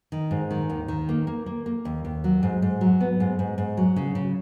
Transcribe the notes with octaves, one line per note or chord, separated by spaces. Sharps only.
D#3
G#2
D#3
D#2
D#3
A#3
A#3
A#3
A#3
D#2
D#2
F#3
G#2
G#2
F#3
B3
G#2
G#2
G#2
F#3
C#3
C#3